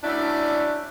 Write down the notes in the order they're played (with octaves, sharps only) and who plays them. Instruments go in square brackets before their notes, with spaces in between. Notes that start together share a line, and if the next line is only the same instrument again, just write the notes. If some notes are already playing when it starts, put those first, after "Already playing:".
[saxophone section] F#3 A3 C#4 D4 E4 D5